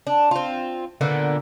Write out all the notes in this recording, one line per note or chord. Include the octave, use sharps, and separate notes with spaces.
D4
C4 F4
A#2 D3 A#3 B3